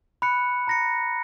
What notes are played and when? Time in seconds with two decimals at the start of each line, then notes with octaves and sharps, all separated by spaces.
0.22 B5 F#6 C#7
0.67 A#5 A#6 C#7